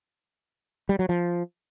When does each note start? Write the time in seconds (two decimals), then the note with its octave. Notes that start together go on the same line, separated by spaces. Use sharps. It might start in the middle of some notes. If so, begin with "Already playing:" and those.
0.89 G3
0.99 F#3
1.09 F3